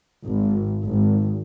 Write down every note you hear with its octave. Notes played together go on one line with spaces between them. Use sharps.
G#1
G#1